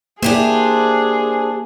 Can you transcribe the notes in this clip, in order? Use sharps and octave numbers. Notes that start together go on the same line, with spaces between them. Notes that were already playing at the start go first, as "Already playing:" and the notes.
A#3 D4 E4 G4 G#4 C5